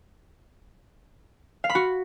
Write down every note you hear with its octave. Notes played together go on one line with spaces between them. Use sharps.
F5
B5
F#4